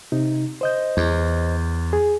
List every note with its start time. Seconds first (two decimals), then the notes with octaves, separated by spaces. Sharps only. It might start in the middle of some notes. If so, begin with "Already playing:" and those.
0.12 C3 D#4
0.61 C5 D#5 G6
0.97 E2
1.93 G#4